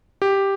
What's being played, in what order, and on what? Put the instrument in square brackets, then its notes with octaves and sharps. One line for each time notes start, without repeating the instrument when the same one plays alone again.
[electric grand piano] G4